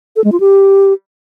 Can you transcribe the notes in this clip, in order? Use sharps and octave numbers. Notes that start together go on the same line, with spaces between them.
A4
G#3
F4
G4